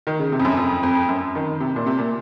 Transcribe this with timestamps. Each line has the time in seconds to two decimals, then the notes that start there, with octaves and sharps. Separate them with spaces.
0.07 D#3
0.19 C#3
0.32 C3
0.39 F2
0.45 F#2
0.57 F2
0.83 F2
1.08 F#2
1.35 D#3
1.60 C3
1.76 A#2
1.86 C3
1.99 A#2